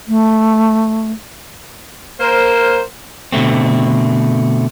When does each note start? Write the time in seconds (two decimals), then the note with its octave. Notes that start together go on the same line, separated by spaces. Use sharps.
0.08 A3
2.20 A#3 A#4 C5
3.32 B2 D3 A3 C4